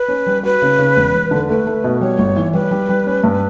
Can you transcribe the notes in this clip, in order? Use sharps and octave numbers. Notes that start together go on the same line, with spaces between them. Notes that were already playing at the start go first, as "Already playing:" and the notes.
Already playing: B4
C#4
G3
F#4 B4
C#3
C#3
E1
E1
D3
A3 B4
A3
B2
G3 C#5
G1
E3
G3 B4
G3
G3
C#4
G2